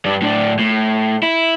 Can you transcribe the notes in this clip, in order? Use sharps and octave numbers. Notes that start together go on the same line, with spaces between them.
G2 D4
A2 D4
A2
E4